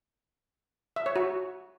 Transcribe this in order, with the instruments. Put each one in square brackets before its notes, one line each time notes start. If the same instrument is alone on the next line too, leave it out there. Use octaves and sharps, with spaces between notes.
[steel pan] E5
C#5
F#4